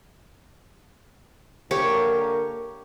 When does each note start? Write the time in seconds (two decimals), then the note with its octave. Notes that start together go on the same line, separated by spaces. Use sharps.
1.71 D3 A#3 G4 A#4 C#5